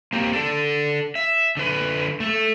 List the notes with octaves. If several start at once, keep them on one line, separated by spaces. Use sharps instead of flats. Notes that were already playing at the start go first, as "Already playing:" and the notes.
A#3 C4 G4
D4 A4
E5
D3 B4
A3 A4